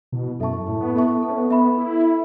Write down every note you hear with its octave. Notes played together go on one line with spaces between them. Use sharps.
B2 E4
F#2 A4 E5 A5 C#6
A2 E4
B3
B3 A4 E5 A5 C#6
B3 A4
C#4
B3
B3 E5 B5
E4 A4
E5 B5